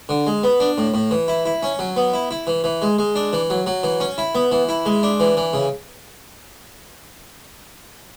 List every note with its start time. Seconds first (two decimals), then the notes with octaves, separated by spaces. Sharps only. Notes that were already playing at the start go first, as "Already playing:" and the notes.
0.09 D3
0.27 G#3
0.43 B3
0.60 D4
0.78 A2
0.94 A2
1.11 E3
1.28 E4
1.46 E4
1.63 C#4
1.79 F#3
1.96 B3
2.13 E4
2.31 E4
2.47 E3
2.64 E3
2.82 G#3
2.98 G#3
3.15 D4
3.33 E3
3.50 F#3
3.66 F#3
3.83 E3
4.00 C#4
4.18 E4
4.35 B3
4.52 E3
4.69 E4
4.86 G#3
5.03 D4
5.20 E3
5.37 E3
5.53 C#3